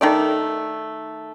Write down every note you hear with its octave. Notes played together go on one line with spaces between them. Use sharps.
D#3 A3 D5